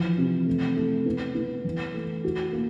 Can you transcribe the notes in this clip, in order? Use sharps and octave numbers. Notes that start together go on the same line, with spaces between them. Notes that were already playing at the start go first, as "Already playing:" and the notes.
Already playing: E3 F3
C3
A3
A3
B3
B3
E3
A3
F#4
A#3